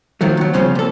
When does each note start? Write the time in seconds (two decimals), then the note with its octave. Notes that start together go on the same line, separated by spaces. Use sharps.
0.21 A2 D#3 F3 F#3
0.37 D#2 F#3
0.53 G2 C#3 F3 C4 C#4
0.75 A#2 A4